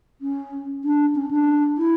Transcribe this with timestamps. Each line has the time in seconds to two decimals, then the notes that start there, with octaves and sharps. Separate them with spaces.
0.21 C#4
0.84 D4
1.15 C#4
1.31 D4
1.78 E4